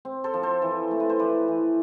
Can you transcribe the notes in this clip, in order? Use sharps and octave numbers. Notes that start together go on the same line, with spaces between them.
C4
A4 C5
F3
A4 C5
E3
A3
B4
C5
E3 B4 D5
E3